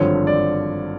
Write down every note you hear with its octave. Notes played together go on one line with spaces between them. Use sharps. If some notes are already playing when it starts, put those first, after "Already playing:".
Already playing: G#1 G2 D3 F3 C#5
D5